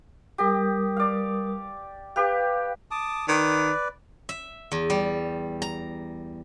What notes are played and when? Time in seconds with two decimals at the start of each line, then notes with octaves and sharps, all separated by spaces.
0.38 G3 G4 A#4 D#6
0.96 D5 F5
2.16 G4 B4 F5 G5
2.91 A5 D6 D#6
3.28 D#3 B4 D5
4.29 E5
4.72 E2
4.90 G3
5.62 A#5